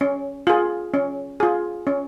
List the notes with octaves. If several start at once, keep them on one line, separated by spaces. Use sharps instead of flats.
C#4
F4 G#4
C#4
F4 G#4
C#4